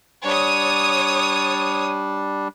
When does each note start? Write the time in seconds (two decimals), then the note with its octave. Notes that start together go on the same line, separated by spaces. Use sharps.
0.24 G3 D4 C#5 D#6